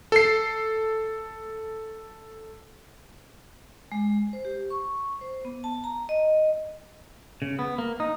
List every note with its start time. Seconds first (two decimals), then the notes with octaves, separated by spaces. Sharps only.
0.12 A4 C7
3.92 G#3
4.33 C5
4.45 G4
4.70 C#6
5.21 C5
5.45 B3
5.64 A5
5.84 A#5
6.09 D#5
7.42 C#3
7.59 B3
7.78 A#3
8.00 D#4